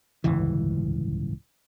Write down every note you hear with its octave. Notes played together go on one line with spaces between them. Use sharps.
D1 G1 C#2 E3